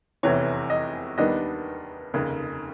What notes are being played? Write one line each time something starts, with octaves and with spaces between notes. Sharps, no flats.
F1 E2 C3 E3 C#5
D#5
D#2 D#3 G3 B3 D4 D#5
F1 D#2 C#3